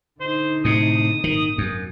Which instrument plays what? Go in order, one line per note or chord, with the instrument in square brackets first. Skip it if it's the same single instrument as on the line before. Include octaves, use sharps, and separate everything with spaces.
[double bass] D3 D#4 [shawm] C5
[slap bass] A2 C3 [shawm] D#6
[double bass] G#1 A#2 [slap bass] D#3
[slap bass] F#2